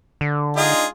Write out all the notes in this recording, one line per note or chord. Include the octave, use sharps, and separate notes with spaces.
D3
G#3 D4 D#4 F4 G#4